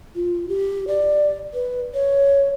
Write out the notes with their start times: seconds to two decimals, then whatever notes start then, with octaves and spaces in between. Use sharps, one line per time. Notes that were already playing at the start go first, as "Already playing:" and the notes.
0.15 F4
0.49 G4
0.88 D5
1.54 B4
1.94 C#5